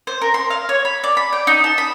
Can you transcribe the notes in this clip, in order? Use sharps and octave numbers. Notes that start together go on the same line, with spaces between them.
C5
A#4
C6
F5
C#5
B5
D5
B5
G5
D#4
A5
B5